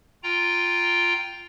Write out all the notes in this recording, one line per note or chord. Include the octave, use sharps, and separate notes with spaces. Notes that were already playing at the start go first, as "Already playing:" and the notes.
F4 G5 A#5